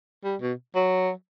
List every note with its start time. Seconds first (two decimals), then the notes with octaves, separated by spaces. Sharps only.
0.24 G3
0.41 B2
0.75 F#3